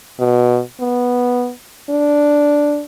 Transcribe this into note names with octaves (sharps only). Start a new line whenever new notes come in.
B2
B3
D4